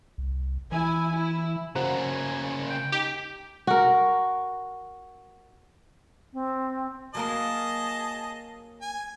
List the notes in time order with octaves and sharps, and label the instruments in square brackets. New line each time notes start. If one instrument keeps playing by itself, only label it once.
[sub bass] C2
[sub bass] E3 [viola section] E4 G#5
[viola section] E4
[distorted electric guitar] C#3 A#3 [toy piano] F#4 C5 A#5 [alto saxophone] F#5
[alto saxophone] G#5
G5
[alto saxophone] D#4 [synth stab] G4
[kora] F#4 A#4
[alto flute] C4
[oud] F#3 A#3 A#4 [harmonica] G#4 D#5 A5
[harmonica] G#5